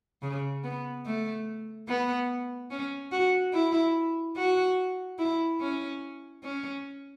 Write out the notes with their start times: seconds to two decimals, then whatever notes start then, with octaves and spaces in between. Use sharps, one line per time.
0.22 C#3
0.64 B3
1.06 A3
1.88 B3
2.71 C#4
3.12 F#4
3.53 E4
4.37 F#4
5.18 E4
5.61 C#4
6.43 C#4